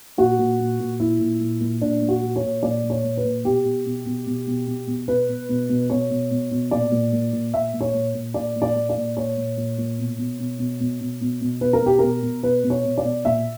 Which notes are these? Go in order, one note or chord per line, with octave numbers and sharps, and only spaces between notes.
A#2 F#4
A#2
A#2
A#2
A#2 E4
A#2
A#2
A#2
A#2 D4
A#2
F#4
A#2
C#5
A#2
A#2 D5
A#2
C#5
A#2
B4
A#2
B2 G4
B2
B2
B2
B2
B2
B2
B2
B2 B4
B2
B2
B2
B2 C#5
B2
B2
B2
A#2 D5
A#2
A#2
A#2
A#2 E5
A#2
C#5
A#2
A#2
A#2 D5
A#2
D5
A#2
D5
A#2
A#2 C#5
A#2
A#2
A#2
B2
B2
B2
B2
B2
B2
B2
B2
B2 B4
A#4
B2 G4
B2 A#4
B2
B2 B4
B2
C#5
B2
D5
B2
A#2 E5